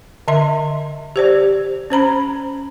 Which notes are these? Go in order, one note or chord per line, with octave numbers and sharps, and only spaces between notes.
D3 D#5 E5 C6
G4 C5 D5
C#4 C5 A#5 B5